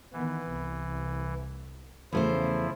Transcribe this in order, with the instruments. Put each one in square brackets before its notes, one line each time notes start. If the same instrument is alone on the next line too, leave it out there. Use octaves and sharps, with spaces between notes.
[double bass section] D#3 B3 [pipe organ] E3
[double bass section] C2
[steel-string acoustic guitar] E2 A3 C5 [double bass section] C#3 [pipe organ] F3 E4